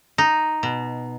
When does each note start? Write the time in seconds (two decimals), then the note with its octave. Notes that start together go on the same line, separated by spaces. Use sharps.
0.18 D#4
0.63 B2